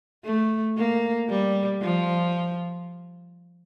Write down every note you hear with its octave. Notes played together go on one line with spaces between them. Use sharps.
A3
A#3
G3
F3